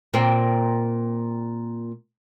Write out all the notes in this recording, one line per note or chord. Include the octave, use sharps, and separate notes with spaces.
A#2 C4